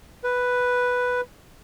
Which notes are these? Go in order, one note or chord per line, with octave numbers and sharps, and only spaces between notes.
B4